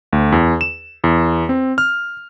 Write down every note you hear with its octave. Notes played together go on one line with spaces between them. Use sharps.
D2
E2
E7
E2
C4
F6